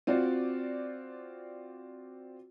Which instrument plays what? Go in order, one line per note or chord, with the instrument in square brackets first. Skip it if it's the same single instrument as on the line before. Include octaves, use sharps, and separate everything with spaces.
[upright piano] C4 F4 F#4 D5